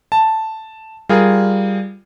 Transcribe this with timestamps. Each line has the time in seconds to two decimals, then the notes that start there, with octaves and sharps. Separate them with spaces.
0.12 A5
1.09 G3 F4 G#4 A#4